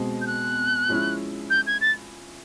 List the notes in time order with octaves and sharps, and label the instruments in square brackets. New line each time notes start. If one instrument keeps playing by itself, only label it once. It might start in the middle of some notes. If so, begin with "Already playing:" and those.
Already playing: [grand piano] B2 G#3 C4
[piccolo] G6
F#6
[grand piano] F3 G#3 C#4 E4
[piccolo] G6
G#6
A6